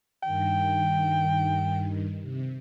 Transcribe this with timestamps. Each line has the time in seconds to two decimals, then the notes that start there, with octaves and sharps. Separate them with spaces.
0.23 G2 D#3 G5
2.22 C3